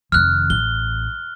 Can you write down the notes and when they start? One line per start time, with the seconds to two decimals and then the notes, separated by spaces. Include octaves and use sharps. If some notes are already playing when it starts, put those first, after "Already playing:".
0.12 F1 D#3 F6 F#6
0.50 A1 G7